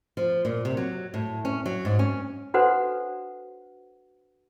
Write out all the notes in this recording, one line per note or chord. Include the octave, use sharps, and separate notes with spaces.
F3
A#2
C3
F#3
A2
C#4
F#3
G#2
C#4
D4 F#4 A4 B4 C5 F#5